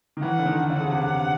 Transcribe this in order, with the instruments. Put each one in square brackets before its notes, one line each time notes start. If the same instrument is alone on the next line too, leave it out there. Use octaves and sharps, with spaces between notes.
[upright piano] D#3
[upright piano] E3 [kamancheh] F#5
[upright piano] D3
D#3
[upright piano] D3 [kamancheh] F#5
[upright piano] C#3
C3
C#3